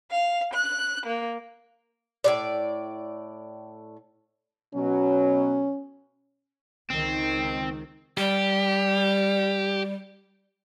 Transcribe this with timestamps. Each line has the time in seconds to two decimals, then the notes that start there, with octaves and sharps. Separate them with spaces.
0.12 F5
0.53 F#6
1.06 A#3
2.24 A2 F3 D5
4.75 B2 F#3 C#4
6.90 C#2 D#3 C4
8.17 G3 G4